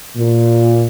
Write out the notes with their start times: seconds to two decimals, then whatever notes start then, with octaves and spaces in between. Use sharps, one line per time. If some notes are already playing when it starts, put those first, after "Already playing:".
0.17 A#2